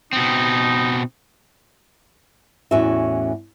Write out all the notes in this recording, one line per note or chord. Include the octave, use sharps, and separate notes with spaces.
B2 C4 D#4
E2 A2 C#4 F#4 E5